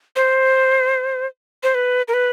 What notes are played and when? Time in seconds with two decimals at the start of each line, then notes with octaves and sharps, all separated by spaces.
0.16 C5
1.63 C5
1.75 B4
2.08 A#4
2.14 B4